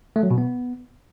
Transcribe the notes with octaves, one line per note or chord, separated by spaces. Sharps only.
A3
F#3
B2
B3